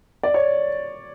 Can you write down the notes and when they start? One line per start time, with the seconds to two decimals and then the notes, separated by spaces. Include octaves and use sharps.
0.23 D5
0.34 C#5